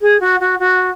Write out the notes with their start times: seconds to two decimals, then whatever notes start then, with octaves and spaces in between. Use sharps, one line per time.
0.01 G#4
0.20 F#4
0.40 F#4
0.59 F#4